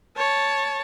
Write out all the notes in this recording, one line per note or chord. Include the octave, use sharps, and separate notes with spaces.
C#5 A5